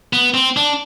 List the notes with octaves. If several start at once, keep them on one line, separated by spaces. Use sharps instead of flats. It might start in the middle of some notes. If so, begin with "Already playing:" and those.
B3
C4
D4